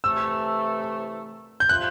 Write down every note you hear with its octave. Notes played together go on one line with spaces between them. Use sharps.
C3 E3 A3 E6
G6
C3 F3 A3 C4 F4 F#6